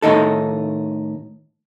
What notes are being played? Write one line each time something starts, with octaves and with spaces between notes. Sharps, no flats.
A2 D#3 D#4 A4